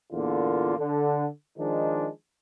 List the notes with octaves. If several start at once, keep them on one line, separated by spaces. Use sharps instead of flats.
E2 A#2 D3 A#3 F4
D3
D#3 F3 G#3 D4 D#4